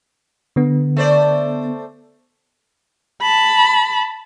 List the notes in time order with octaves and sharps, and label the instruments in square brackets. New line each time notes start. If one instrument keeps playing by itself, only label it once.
[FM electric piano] D3 B3
[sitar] A3 C5 D5
[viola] A5 B5